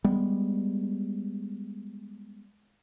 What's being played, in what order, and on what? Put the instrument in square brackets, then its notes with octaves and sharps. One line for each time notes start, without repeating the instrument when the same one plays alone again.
[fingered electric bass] G3 G#3 B3